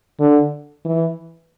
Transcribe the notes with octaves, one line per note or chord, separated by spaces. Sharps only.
D3
E3